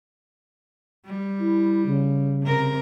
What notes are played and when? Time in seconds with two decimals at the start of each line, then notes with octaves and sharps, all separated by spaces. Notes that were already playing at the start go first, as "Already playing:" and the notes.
1.05 G3
1.39 E4
1.86 C#3
2.43 C3 A#4